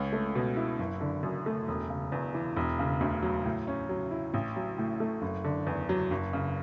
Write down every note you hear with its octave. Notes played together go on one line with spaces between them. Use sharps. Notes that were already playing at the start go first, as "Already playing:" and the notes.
Already playing: C#2 C#4
A3
B2
E4
F#1
D3
F#2
A3
E1
C#3
E2
E3
E1
C#3
D2
F#3
A2
C#4
F#3
E4
A1
F#3
A2
A3
F#1
D3
E2
F#3
F#1
C#3